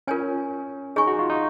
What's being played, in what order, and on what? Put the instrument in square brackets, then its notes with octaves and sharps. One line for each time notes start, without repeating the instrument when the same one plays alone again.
[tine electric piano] C#4 [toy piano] F4 A#4 C#5 G#5
[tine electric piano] D#4 [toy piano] G#4 C#5 G#5 C#6
[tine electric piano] F#4
F4
D#4